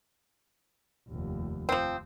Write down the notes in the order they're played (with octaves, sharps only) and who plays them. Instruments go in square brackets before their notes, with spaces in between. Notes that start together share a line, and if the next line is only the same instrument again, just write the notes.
[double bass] F1 D#2
[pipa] F3 C4